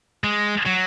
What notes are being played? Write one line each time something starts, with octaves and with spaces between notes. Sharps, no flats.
G#3
F#3